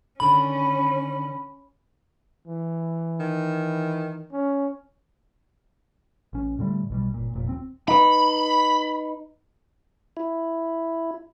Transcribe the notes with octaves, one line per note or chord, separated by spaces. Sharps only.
D3 D#3 C#4 B5
E3
D#3
C#4
A1 C#4
A2 D3 G3 A3
B1 B2 G3
G1 A#2
F1 A#2
D#1 C4
D#4 B4 B5
E4